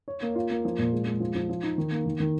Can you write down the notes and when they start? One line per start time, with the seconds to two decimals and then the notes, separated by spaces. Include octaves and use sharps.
0.08 C#5
0.22 A#3
0.35 F4
0.50 A#3
0.65 F3
0.79 A#2
0.93 G#3
1.06 G#3
1.20 F3
1.35 F3
1.49 F3
1.63 D#4
1.78 D#3
1.92 A#3
2.06 D#3
2.20 D#3